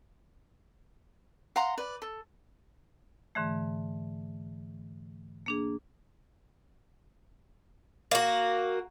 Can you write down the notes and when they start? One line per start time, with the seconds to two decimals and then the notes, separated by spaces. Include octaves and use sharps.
1.56 F5 F#5 A#5 C6
1.78 B4 D5
2.02 A4
3.35 G#2 D3 E3 A3
5.46 A#3 D4 G#4
8.11 A#3 F#4